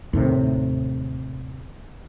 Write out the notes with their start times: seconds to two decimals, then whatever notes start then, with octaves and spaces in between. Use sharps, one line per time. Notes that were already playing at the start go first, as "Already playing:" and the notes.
0.13 D#2 A2 C3